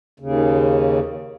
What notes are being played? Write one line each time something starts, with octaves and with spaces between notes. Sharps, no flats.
D#2 C#3